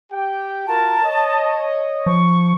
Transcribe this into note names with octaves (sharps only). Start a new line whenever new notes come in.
G4 G5
F4 F#4 A#4 A5
C#5 D#5
F3 C#6